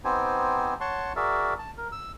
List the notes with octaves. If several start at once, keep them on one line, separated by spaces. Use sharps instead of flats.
B3 C4 D#4 G4 C5 G#5
C#5 F#5 A5 C6 C#6
F#4 G#4 A#4 D5 E5
A5
A#4
E6